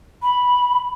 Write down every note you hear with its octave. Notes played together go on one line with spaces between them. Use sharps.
B5